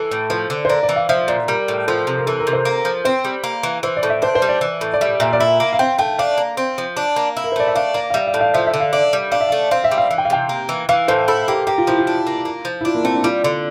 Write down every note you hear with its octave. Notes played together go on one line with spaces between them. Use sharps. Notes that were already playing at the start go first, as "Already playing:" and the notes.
Already playing: E3 A4
A2
F3 C5
D3
C5
A#3 D5
D5
E3
F5
F3 E5
A#2 D5
G3 A#4
A2
F3 A4
C3
A#4
E3 A4
A#4
C3
C5
A#3
F3
C4 C5
G3
A#3
E3
E3 C5
D5
A2
E5
D4 C5
C5
G3
D5
E3
A2
D5
G3 E5
A#2 E5
D5
E4 E5
A#3
F5
C4 G5
A3 G5
D4 F5
A#3
C4
F3
D4
A#3
E4
A#4
C5
A3 D5
E5
D4 F5
A#3 D5
F5
G3 E5
F5
A2
F5
F3 E5
E5
D3
F5
D4 E5
G3
D4 F5
E5
A3 F5
C4 F5
E5
G3
F5
E3
G5
F5
C3 G5
A#3
E3
E3 F5
A2 C5
E4 A4
A#3 G4
A#3 G4
F4
F3 E4
F4
D4
A#3
A#3
F3
E4
D4 F4
A#3
A3 C4
D4
G3 F4
D3 D5